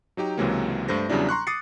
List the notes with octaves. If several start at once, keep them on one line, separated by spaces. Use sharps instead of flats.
F#3 D#4 G4 G5
C#2 C3 E3 F#3 G#3 A#3
G2 A3 C5 A#6
E2 C#3 F#3 G3 D4 E4
A#5 C6 C#6 F#6
D6 D#6 A6 C7 C#7